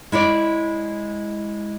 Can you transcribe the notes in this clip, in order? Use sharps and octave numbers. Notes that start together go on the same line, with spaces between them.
G#3 E4 C#5 D5